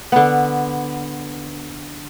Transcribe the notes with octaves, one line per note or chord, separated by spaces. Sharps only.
D3 B3